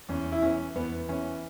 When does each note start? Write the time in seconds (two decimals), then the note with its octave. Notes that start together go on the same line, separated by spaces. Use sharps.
0.09 E2 C#4
0.32 E4
0.42 E3 B3 C#4
0.75 E2 B3
1.08 E3 B3 C#4